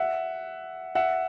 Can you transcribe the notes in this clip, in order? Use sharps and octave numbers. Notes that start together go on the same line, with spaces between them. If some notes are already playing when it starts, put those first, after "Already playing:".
Already playing: E5 F#5
E5 F#5